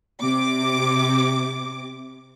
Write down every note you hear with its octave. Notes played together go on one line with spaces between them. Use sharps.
C3 D6